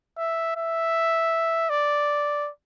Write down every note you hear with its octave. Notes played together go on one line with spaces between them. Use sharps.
E5
E5
D5